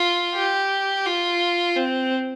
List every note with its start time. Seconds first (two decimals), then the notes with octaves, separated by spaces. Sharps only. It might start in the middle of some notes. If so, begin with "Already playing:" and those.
Already playing: F4
0.35 G4
1.06 F4
1.77 C4